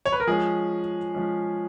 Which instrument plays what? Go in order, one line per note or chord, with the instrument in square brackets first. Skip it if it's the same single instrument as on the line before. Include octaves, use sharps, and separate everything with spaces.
[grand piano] C#5
B4
A#4
F3 G#3 C#4 G#4
F3 G#3 C#4